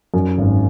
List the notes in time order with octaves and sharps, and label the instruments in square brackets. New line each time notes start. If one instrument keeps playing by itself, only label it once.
[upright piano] F#2
G#1